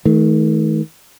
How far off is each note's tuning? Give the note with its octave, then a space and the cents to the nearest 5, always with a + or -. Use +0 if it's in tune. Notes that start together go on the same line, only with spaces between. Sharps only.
D#3 +40 A3 -20